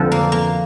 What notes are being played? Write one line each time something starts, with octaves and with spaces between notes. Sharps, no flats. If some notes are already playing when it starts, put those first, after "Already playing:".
Already playing: F2 D3 F3
A#3
A#3